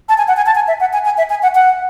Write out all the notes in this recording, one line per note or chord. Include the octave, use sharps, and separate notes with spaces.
A5
G#5
F#5
G#5
A5
G#5
E5
F#5
G#5
G#5
E5
G#5
F#5
F#5